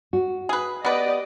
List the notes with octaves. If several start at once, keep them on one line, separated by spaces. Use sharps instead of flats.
F#4
G#4 B4
B3 G4 B4 D5 D#5